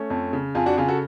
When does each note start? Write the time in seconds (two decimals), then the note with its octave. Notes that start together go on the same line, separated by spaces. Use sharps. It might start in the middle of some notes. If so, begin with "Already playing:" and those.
Already playing: A3 C#4
0.10 F2
0.33 C#3
0.55 F2 F4 G#4
0.66 D4 F#4
0.77 C#3 F4 G#4
0.88 F#4 A4